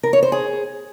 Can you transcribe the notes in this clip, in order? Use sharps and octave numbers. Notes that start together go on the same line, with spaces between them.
A#4
C#5
C5
G#4